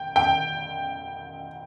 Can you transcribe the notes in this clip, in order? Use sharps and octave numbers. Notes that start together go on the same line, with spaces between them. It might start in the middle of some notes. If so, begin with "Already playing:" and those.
Already playing: G5
G5